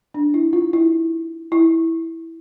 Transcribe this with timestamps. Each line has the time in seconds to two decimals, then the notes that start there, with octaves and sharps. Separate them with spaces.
0.14 D4
0.34 E4
0.53 F4
0.73 E4
1.52 E4